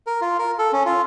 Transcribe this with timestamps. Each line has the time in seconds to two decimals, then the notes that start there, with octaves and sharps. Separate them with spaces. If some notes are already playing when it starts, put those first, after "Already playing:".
0.07 A#4
0.21 F4
0.39 A#4
0.59 A4
0.73 C#4
0.86 F4